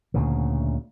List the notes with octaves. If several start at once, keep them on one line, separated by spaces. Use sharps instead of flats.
D2 A#2 C#3